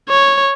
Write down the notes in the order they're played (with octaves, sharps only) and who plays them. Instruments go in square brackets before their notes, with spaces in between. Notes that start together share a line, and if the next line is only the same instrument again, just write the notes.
[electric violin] C#5